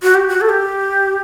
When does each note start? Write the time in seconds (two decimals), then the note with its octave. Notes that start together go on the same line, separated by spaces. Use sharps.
0.03 F#4
0.15 G4
0.28 F#4
0.41 A4
0.49 G4